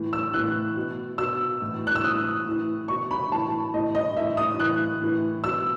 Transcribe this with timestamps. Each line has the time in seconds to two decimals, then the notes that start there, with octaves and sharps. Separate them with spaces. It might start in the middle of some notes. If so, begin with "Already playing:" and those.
Already playing: A2 E3
0.13 E6
0.34 A2 E3 F#6
0.76 B2
1.18 B2 E6
1.62 A2 E3
1.87 F#6
1.96 E6
2.04 A2 E3 D#6
2.46 A2 E3
2.88 B2 C#6
3.11 B5
3.32 A2 E3 A5
3.74 A2 E3 D#5
3.95 D#5
4.17 A2 E3 E5
4.37 D#6
4.59 A2 E3 F#6
5.01 A2 E3
5.44 B2 E6